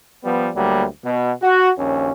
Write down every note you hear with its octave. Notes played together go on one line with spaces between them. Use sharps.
F3 G3 B3
D2 F#3 G3 A#3
B2
F#4
A#1 D#2 C#4